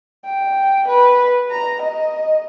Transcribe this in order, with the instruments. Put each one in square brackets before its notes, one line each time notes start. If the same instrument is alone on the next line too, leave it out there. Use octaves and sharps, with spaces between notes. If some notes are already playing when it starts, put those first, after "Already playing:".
[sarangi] G5
B4
A#5
D#5